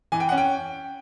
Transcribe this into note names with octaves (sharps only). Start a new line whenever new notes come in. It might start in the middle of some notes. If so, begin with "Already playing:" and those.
E3 G#5
G5
C#4 F#5
G5